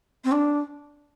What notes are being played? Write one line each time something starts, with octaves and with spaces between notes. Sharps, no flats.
C4
D4